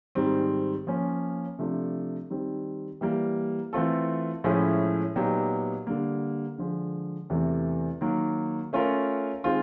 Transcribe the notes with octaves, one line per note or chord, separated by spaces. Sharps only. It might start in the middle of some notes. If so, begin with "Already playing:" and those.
G#2 D#3 G3 C4
F3 A#3 C#4
C3 F3 A3 D4 F4
D#3 G3 C4
E3 G3 A#3
E3 A3 C4 F4 A4
A2 F3 G#3 C#4 E4
A#2 F#3 B3 D#4 G4
D3 G3 A#3
D3 F3 G#3
E2 C3 E3 A3
D#3 F#3 A#3
A3 C#4 F4 A#4 C#5
D#3 G#3 C4 F4